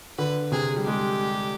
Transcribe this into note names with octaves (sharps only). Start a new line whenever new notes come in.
D3 B4
C3 G#4
G3
G#3 G4